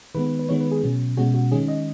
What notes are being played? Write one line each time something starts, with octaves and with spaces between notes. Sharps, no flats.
D#3 G#3 B3 B4
B4
D#3 G#3 B3 C#5
B4
G#4
B2 F#3 C#4
B2 G#3 C#4 F#4
F#4
D#3 G#3 C#4 G#4
D#5